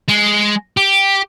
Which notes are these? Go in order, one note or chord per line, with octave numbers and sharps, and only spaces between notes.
G#3
G4